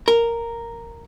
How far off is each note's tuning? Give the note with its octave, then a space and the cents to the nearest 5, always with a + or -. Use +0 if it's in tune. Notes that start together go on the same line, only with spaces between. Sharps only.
A#4 -5